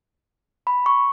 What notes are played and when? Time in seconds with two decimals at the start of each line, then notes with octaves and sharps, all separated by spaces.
0.67 B5
0.86 C#6